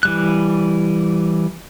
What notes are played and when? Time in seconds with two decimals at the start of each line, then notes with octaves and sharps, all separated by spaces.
0.03 E3 G3 F#6